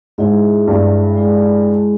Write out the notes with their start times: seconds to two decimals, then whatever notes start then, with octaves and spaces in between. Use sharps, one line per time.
0.18 G#2 G#3 E4 G#4 C#5 E5
0.67 G2
1.16 G#3 E4 G#4